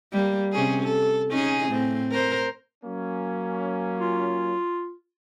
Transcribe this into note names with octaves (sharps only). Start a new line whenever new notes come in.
G3 A#3
C3 C#4 G#4
A4
C#4 D#4 G#4
A2 C4
A#4 C5
F#3 A#3 C#4
F4